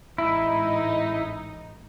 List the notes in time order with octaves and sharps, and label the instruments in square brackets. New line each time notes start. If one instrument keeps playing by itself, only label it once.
[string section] A1 G#2 D#4 [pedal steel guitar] E4